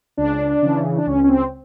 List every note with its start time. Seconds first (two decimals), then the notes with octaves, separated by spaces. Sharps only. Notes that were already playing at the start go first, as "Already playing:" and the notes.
0.17 C#2 D4
0.62 C#3 E3
0.98 D4
1.07 C#2 C#4
1.24 C#4
1.29 C4